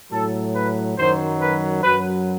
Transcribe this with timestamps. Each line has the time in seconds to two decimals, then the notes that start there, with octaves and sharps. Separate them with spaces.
0.12 A2 F#3 A4
0.55 B4
0.98 F#2 D#3 F#3 C5
1.41 B4
1.83 F#2 F#3 B4